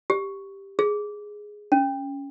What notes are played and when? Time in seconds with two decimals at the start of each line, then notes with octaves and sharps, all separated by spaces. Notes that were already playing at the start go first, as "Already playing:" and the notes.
0.10 G4
0.79 G#4
1.72 C#4